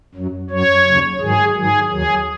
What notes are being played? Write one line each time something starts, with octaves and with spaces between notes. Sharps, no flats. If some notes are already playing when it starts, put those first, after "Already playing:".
F#2 F#3
F#2 F#3 C#5
D#2 C#3 F#3
G#2 D#3 F#3 G#4
G#2 D#3 F#3 G#4
D#2 D#3 F#3 G#4